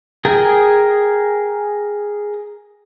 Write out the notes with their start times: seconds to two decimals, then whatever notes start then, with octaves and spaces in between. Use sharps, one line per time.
0.25 G#4 A#4 G5 G#5